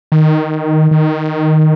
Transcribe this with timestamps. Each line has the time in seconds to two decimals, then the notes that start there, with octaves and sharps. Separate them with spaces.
0.12 D#3
0.91 D#3